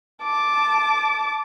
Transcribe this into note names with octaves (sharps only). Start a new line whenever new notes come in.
A5 D6